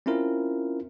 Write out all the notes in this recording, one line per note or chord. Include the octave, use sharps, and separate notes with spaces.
C4 C#4 E4 F4 A#4